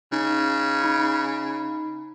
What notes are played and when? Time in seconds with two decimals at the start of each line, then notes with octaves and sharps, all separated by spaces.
0.12 C#3 D#4
0.82 D#4 B5